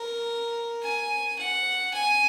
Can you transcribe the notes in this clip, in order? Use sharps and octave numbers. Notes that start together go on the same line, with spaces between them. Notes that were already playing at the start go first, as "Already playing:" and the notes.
Already playing: A#4
G#5
F#5
G#5